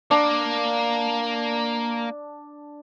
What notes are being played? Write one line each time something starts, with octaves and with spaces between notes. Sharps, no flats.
A#3 D4